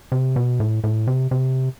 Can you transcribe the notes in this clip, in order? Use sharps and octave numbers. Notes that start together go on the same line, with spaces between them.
C3
B2
A2
A2
C3
C3